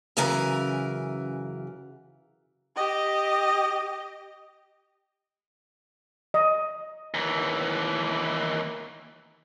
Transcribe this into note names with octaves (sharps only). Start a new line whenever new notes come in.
F#2 C#3 E3 A#4 G#5
G4 D#5
D#5
D#2 E3